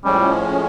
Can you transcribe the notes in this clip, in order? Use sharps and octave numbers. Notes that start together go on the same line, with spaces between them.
A2 F3 G3 G#3 C#4